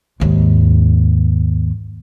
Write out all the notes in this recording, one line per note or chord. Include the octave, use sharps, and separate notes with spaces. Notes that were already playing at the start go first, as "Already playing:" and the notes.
D#2 G#2